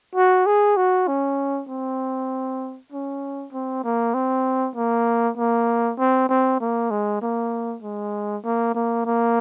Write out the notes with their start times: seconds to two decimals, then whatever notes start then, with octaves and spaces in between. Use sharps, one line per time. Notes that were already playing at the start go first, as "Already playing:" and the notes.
0.15 F#4
0.46 G#4
0.77 F#4
1.08 C#4
1.69 C4
2.92 C#4
3.52 C4
3.84 A#3
4.14 C4
4.75 A#3
5.37 A#3
5.99 C4
6.29 C4
6.60 A#3
6.91 G#3
7.21 A#3
7.82 G#3
8.44 A#3
8.74 A#3
9.06 A#3